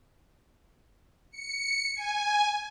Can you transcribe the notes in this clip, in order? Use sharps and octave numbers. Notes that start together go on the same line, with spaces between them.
C#7
G#5